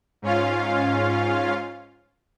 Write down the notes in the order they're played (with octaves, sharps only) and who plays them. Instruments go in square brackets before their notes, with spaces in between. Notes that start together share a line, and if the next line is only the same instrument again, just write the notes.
[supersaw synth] G#2 C#4 F4 F5